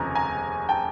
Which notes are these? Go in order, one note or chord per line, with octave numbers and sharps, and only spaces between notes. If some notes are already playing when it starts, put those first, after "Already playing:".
Already playing: F1 D#2 C#3 F3 G#5 A#5
G#5 A#5
G5 A5